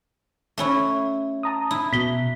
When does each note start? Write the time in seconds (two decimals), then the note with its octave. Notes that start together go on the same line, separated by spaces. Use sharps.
0.58 A3 C#4 E4
1.43 A5 A#5 D#6
1.71 E4
1.93 B2 B6 G7